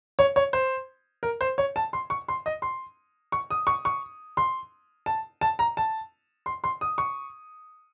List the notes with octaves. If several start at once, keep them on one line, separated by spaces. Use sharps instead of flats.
C#5
C#5
C5
A#4
C5
C#5
A5
C6
C#6
C6
D#5
C6
C#6
D#6
C#6
C#6
C6
A5
A5
A#5
A5
C6
C6
D#6
C#6